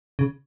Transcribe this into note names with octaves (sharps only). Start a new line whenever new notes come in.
C#3